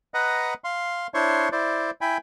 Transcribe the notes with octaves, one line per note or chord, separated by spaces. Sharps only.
B4 D#5 F#5 A#5
F5 C6
D4 E4 C5 C#5 C6 C#6
E4 C5 D5
E4 G5 G#5 B5